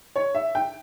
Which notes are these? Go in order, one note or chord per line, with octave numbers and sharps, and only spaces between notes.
C#5
E5
G5